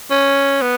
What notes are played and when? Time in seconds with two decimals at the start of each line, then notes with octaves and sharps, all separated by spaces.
0.11 C#4
0.62 B3